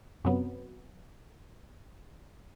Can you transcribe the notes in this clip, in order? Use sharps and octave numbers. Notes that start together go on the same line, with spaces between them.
F#2 C3 F#3 B3